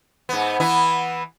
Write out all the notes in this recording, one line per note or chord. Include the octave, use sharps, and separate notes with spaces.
G#2 B3
E3 B3 E4